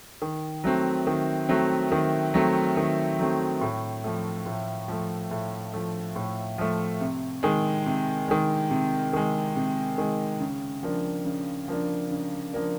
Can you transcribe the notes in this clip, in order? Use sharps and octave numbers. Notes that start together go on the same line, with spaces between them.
D#3
F#3 A3 C4
D#3
F#3 A3 C4
D#3
F#3 A3 C4
D#3
F#3 A3 C4
A2
F3 A3
A2
F3 A3
A2
F3 A3
A2
F3 A3
C3
D#3 G#3
C3
D#3 G#3
C3
D#3 G#3
C3
D#3 G#3
C#3
F3 A#3 D4
C#3
F3 A#3 D4
C#3
F3 A#3 D4